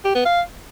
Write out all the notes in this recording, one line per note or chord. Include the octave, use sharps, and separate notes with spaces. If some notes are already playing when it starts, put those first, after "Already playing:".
G4
B3
F5